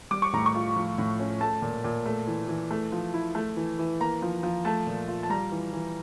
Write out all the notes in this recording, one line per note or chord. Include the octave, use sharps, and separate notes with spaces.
G3 D6
C#6
A2 A#5
C#6
F4
F3
A2
C#4
A3 A5
A#2
A#2
A3
E3
E3
A3
F3
E4
A3
E3
E3
A#3 A#5
F3
F3
A3 A5
A#2
F4
A5
G3 A#5
E3
E3